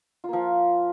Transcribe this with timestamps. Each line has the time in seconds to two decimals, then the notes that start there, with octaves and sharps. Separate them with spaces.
0.24 F4
0.28 A#3
0.33 F3